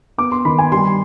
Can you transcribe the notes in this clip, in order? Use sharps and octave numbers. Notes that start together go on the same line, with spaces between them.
B3 D6
C6
D#3 B5
G#5
G3 C6